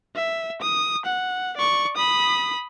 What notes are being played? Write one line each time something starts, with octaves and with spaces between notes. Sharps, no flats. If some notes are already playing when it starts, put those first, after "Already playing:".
E5
D#6
F#5
D5 C#6
B5 D#6